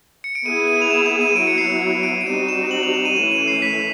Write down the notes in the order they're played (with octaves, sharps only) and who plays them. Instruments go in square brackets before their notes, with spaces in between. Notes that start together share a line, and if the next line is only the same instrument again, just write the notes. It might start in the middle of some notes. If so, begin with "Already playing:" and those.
[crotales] C#7
D7
[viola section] B3 E4 G#4 [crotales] D#7
[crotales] D#7
F7
E7
E7
D#7
[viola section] F#3 B3 E4 [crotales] D7
[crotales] C#7
C7
C#7
D7
D7
[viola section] G3 C4 D#4 F#4 [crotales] D#7
[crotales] E7
F#7
F7
E7
D#7
[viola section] E3 A3 C#4 [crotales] E7
[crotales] D#7
C7
B6